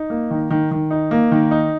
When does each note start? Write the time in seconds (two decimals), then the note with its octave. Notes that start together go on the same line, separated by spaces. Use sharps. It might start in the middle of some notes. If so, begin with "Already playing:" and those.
Already playing: D#4
0.10 A#3
0.31 D#3
0.50 D#3
0.71 D#3
0.91 D#4
1.11 A#3
1.31 D#3
1.51 D#4